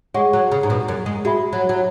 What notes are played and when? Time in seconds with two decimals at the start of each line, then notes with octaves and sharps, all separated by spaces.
0.14 G#3 G#4 C#5 F#5 C#6
0.33 F#3
0.52 C#3
0.63 G#2
0.70 B2
0.88 F#2
1.06 G#3
1.25 G#3 F#4 E5 B5
1.53 F#3
1.69 F#3